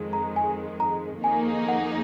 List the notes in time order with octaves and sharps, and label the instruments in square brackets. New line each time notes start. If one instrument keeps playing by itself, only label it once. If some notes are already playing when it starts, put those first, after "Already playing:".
Already playing: [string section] F2 D#3 G#3
[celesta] A#5
G#5
A#5
[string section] F2 D#3 A#3 D#4 G#4 [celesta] G#5
[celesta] F#5